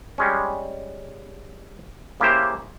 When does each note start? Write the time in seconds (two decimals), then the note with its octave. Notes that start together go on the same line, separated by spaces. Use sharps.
0.18 G3 G#3 C#4
2.20 C#3 A#3 E4 G4 C5